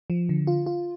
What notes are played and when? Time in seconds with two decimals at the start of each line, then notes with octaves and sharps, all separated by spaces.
0.10 F3
0.29 D3
0.47 F4
0.66 F4